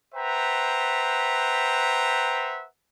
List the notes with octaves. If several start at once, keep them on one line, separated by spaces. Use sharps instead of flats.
B4 C5 E5 F#5 G5 A#5